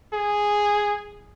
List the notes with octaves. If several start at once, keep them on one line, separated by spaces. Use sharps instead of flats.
G#4